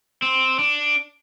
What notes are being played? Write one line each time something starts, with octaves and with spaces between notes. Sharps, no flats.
C4
D4